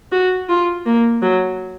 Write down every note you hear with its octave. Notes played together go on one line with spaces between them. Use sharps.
F#4
F4
A#3
F#3